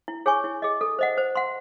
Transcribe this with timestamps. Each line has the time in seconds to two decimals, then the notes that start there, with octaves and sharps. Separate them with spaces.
0.08 E4
0.26 G#4 C#5 G#5 C#6
0.44 E4
0.62 G#4 D#5
0.81 A4
0.99 C5 D#5 F#5
1.18 C5
1.35 F#5 C6